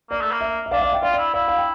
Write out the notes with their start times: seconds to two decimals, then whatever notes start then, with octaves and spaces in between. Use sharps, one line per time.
0.10 A#3 D5
0.21 A3
0.32 A#3
0.41 E5
0.66 E5
0.71 D4 D5 F5
0.78 E5
0.82 D5 F5
0.92 E5 G5
1.02 F4 D5 F5
1.14 D5
1.18 E4
1.34 E4 D5 F5
1.48 F5
1.57 G5